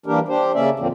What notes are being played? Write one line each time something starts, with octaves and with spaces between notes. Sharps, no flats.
E3 G3 A#3 D4 G4 A#4
D4 G4 C5
C#3 A#3 C#4 D5 E5
E2 A#2 D3 F3 A#3 C4